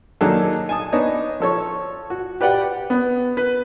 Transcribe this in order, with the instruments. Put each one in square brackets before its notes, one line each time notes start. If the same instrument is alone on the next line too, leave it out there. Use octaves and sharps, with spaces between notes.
[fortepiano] D#3 F#3 A#3 D4 G#4 A4
G#5 A5 D#6
B3 D4 D#4 C#5
F3 A4 C#5 C#6
F#4
G4 B4 D5 F#5 G5
[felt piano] B3
B4